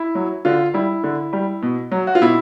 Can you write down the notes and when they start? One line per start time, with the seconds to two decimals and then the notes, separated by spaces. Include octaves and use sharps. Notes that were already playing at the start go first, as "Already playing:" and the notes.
Already playing: E4
0.15 F#3
0.45 D3 F4
0.74 G3 E4
1.04 D3
1.33 G3
1.62 B2
1.92 F#3
2.07 F#4
2.15 F4
2.21 B2 E4